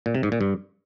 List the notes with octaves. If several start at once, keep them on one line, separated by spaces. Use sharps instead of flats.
A#2
C3
G#2
A#2
G2